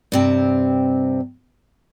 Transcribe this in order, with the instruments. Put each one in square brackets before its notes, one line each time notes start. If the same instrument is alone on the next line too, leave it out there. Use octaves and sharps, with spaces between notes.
[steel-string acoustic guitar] G2 C3 C4